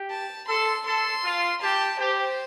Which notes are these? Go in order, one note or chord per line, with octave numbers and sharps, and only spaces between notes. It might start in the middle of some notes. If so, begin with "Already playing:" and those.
Already playing: G4
A5
A4 C6
A4 C6
F4
G4 A5
G4 C5